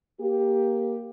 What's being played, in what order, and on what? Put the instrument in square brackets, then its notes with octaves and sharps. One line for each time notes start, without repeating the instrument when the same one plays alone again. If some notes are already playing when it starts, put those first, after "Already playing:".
[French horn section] A#3 G4